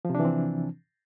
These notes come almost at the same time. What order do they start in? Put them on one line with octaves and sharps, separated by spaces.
F3 C3 D4 E3 C4